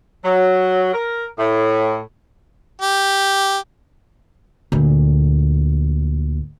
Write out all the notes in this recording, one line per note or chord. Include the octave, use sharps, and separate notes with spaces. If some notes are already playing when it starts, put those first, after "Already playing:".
F#3
A#4
A2
G4
D2 A#2